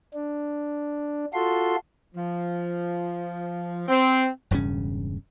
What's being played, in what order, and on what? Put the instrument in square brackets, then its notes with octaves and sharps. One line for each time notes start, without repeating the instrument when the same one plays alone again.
[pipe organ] D4
F4 F#4 A4 C6
[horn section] F3
C4
[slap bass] E1 G2 C#3 C#4